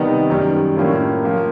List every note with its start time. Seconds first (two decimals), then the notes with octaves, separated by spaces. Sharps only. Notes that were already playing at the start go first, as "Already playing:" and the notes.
Already playing: C3 D#3 G3 B3 D#4
0.29 F#2 D#3 G3
0.76 A2 F3 A#3 C#4
1.24 F3 A#3